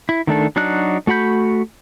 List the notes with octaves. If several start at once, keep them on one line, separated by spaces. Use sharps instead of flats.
E4
D#3 A3 D4 A4
F#3 D4 D#4 F#4 F#6
A3 F#4 F#5 B5 G6